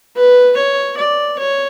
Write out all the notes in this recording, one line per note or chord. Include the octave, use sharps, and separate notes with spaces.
B4
C#5
D5
C#5